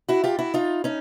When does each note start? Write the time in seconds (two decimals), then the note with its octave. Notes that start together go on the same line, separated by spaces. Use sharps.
0.08 E4 F#4
0.24 F4 G4
0.39 E4 F#4
0.54 D#4 F4
0.84 C#4 D#4